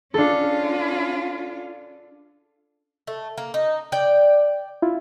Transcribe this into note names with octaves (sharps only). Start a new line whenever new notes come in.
C#4 D4 F4 A4
A3
A#3
D#4
D5 G5
E4 F4